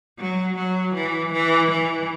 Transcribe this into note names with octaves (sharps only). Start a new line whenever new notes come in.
F#3
F#3
E3
E3
E3